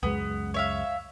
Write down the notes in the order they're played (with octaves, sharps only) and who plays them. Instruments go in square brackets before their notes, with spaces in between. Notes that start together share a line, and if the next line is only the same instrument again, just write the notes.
[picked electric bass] C#2 F#2 G#3 [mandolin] B3
[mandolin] C#5 E5 F5